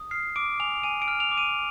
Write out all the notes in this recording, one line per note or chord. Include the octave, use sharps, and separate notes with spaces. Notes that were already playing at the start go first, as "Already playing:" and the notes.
Already playing: D#6
F6 C7
D6 D7
G#5 F7
G#5 D#7
D7
F6
F7
D6
D#7